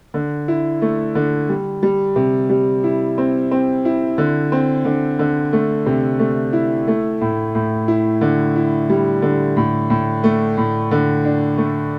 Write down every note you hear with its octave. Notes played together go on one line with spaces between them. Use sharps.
D3
E4
A3
D3
G3
G3
C3
G3
E4
C4
C4
E4
D3
C4
D3
D3
A3
C3
A3
E4
A3
A2
A2
E4
D3
E4
G3
D3
A2
A2
A3
A2
D3
D4
A3